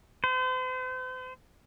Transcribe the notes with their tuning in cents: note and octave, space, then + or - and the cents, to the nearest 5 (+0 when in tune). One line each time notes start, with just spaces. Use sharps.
C5 -40